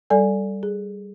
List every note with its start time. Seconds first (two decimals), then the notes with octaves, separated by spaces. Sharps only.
0.10 G3 A4 D5 G#5
0.63 G#4